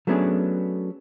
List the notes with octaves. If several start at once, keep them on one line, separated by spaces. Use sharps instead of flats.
F#3 A3 B3 C#4 D4 G#4